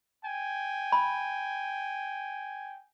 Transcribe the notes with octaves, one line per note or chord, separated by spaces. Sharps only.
G5 G#5
B5